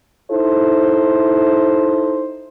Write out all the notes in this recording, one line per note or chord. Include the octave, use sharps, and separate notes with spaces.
D#4 E4 A4 C5